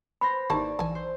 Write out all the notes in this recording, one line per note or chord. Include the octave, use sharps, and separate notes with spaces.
B4 C5 B5 A#6
G#1 A#3 D#4 E4 G4 D5 A5
A#1 E3 G#5 A5 E6
C5